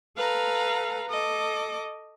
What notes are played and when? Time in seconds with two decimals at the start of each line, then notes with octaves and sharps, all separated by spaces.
0.16 A4 B4 F5 A#5
1.09 A4 D#5 D6